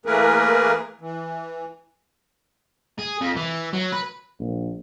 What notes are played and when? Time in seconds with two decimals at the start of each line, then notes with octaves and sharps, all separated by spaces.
0.06 E3 A3 A#3 G#4 A#4 B4
1.01 E3
2.99 G#4
3.21 F2
3.37 E3
3.73 F#3
3.92 B4
4.40 A#1